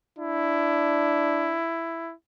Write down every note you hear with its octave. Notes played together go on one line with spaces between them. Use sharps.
D4 E4